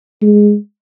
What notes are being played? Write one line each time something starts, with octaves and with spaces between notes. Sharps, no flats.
G#3